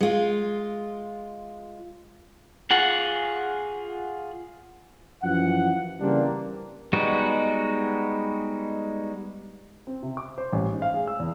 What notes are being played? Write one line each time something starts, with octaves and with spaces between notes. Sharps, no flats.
G#3 F4
F4 G#4 F#5
F#2 E3 F3 F#5
C#3 E3 G3 A#3 C4 D4
G3 G#3 B3 D#4 F#4
C4
C3
D6
C5
A1
G#2
F5
G#4
E6
E2